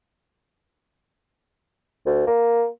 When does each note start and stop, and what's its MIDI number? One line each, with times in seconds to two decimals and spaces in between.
2.06 2.23 38
2.27 2.66 58